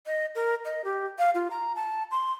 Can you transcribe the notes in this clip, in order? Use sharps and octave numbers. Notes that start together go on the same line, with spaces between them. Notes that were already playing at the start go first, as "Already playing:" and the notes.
D#5
A#4
D#5
G4
F5
F4
A#5
A5
C6